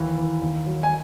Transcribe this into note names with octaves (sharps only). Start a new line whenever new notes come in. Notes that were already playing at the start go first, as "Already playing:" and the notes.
Already playing: D#2 E3
E3
D#2
F#3
G#5